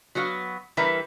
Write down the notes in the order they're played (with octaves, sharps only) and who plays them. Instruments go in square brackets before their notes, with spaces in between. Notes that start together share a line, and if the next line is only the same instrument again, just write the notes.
[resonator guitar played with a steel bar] F#3 B3 F#4 F5
E3 G3 A#4 B4 E5